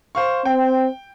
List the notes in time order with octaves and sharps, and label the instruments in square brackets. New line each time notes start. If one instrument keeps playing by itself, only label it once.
[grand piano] C5 F5 C#6
[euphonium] C4 [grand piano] G5